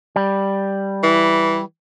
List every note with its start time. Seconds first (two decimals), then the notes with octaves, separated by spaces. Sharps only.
0.16 G3
1.03 E3